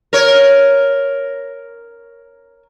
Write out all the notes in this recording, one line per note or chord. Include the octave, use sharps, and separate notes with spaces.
A#4 C#5